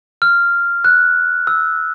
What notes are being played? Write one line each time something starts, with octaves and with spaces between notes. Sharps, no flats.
F6
F#6
E6